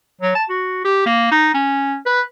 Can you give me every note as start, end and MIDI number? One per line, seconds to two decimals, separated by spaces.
0.21 0.35 54
0.35 0.44 81
0.49 0.80 66
0.85 1.03 67
1.06 1.28 58
1.31 1.51 63
1.54 1.97 61
2.06 2.21 71